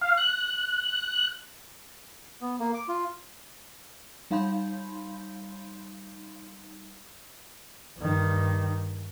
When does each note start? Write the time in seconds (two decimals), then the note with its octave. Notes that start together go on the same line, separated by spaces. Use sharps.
0.01 F5
0.18 F#6
2.41 B3
2.59 A#3
2.74 D6
2.88 F4
4.31 G3 D#4 F5 B5 C6 G6
7.98 G2 D#3